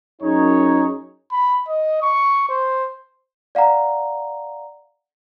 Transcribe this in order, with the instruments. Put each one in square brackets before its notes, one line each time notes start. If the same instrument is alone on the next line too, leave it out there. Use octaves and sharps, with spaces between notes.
[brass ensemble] F#2 D#4 G#4 C#5
[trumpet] B5
D#5
C#6
C5
[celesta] D5 F5 F#5 A#5